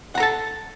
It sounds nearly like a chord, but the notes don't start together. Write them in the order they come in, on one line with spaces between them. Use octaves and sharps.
F#5 A#5 A4 A5